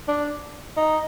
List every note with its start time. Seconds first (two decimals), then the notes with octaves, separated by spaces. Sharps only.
0.08 D4
0.77 D#4